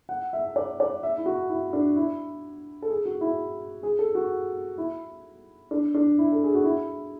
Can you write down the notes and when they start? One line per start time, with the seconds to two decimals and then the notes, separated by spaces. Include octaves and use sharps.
0.09 F#5
0.33 E5
0.56 D5
0.80 D5
1.03 E5
1.18 E4
1.26 F#4
1.49 E4
1.73 D4
1.96 E4
2.82 A4
2.90 G#4
3.05 F#4
3.21 E4
3.83 G#4
3.99 A4
4.15 F#4
4.78 E4
5.71 D4
5.94 D4
6.18 E4
6.32 A4
6.44 G#4
6.54 F#4
6.64 E4